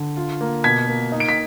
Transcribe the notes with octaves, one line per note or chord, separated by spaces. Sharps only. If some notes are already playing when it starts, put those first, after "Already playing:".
Already playing: D3
F4
A#3
B2 G#6 B6
A#3
D#4
D7
B6